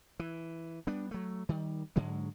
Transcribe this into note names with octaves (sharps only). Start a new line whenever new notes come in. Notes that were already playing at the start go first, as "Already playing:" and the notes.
E3
G3 B3 D4
F#3 A3
D#3 G3
G#2 D3 F#3 G#3